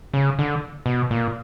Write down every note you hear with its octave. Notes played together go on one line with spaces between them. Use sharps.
C#3
D3
B2
A#2